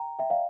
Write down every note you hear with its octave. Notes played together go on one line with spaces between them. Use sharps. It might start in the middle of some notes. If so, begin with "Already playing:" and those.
Already playing: G5 A#5
E5 G5
D5 F5